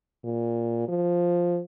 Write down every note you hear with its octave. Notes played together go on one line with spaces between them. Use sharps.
A#2
F3